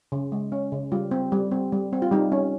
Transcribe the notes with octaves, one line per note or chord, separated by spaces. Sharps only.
C#3
G#3
C#4
C#3
G3 F4
C4
G3
C4
G3
C4
F4
G3 D#4
C#4